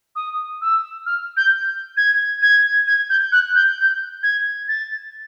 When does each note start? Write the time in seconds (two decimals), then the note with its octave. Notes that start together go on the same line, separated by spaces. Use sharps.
0.16 D#6
0.62 E6
1.06 F6
1.37 G6
1.97 G#6
2.42 G#6
2.87 G#6
3.10 G6
3.32 F#6
3.55 G6
3.78 G6
4.23 G#6
4.68 A6